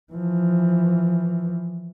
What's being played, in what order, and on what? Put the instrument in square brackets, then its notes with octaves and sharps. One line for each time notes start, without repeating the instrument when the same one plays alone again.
[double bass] E3 F3